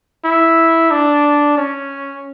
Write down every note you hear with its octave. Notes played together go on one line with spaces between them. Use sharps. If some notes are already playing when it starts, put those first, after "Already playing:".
E4
D4
C#4